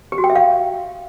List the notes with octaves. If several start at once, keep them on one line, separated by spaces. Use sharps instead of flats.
G4
F#4
G5
E5
F5